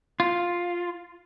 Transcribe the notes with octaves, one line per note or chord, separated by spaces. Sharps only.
F4